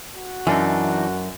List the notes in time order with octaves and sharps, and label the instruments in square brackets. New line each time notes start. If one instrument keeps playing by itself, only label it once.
[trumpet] F#4
[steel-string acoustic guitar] F#2 [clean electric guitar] E3 D4 D#4